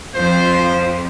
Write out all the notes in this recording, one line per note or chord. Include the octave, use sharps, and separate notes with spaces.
F2 F3 F4 C5